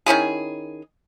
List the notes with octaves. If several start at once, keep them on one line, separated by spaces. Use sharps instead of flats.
D#3 C#4 E4 G#4